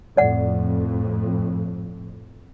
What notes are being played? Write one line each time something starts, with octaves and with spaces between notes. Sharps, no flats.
F2 A2 D5 F#5